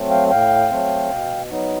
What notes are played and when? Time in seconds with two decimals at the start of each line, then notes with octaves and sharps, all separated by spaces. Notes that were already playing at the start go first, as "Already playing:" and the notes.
Already playing: F#3 A3 C4
0.10 F5 G5
0.30 A2 F5 G5
0.71 F#3 A3 C4
1.10 B2
1.51 F#3 B3 D#4